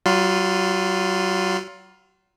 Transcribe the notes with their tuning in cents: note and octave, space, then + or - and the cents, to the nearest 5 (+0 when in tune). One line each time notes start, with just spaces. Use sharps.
F#3 +40 F4 +15 C6 -40